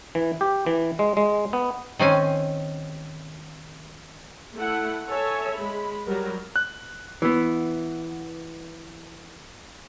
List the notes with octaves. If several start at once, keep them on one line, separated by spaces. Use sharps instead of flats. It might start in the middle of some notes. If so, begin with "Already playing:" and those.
E3
G4
E3
G#3
G#3
B3
D#3 C4 C#4 G#5
A3 E4 F#5
A4 C#5 E5 G#5
G#3 B5
F#3 G3 A#4
F#6
E3 B3